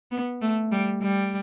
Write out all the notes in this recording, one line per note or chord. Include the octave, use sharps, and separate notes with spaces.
B3
A3
G3
G3